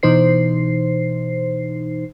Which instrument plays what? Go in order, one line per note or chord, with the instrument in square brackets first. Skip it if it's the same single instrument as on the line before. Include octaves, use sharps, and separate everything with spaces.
[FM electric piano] B2 E3 D#4 C5 C7